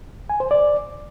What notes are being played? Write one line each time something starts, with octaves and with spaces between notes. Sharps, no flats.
G#5
C5
D5